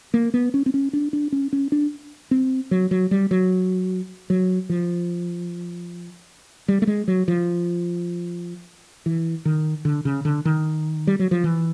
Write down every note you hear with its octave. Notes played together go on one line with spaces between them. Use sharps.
A#3
B3
C#4
C4
C#4
D4
D4
C#4
C#4
D4
C4
F#3
F#3
G3
F#3
F#3
F3
G3
A3
G#3
F#3
F3
E3
D#3
D3
C#3
D3
D#3
G3
F#3
F3
E3